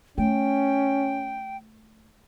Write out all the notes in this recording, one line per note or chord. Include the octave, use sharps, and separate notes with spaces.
A3 C#4 G5